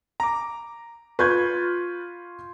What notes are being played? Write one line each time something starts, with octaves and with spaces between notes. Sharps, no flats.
A#5 D6
F4 B4 C#6 G6 G#6